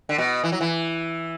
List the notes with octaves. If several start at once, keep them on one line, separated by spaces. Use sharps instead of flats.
D3
B2
E3
F#3
E3